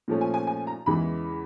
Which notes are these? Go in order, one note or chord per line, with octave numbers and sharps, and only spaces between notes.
A#2 F3 A3 C#4
G#5
G#5
G#5
A#5
E2 C#3 E3 G#3 B5